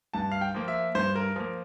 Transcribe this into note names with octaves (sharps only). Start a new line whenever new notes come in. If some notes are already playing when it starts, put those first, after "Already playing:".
G2 A5
F5
G5
F3 A#3
E5
G2 C5
A#4
F3 A#3 A#4